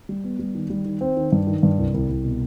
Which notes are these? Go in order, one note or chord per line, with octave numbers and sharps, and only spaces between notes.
G3
B3
G3
D#3
G3
D#3
C4
D#3
G2
D#3
G2
C2
C2
C2
B2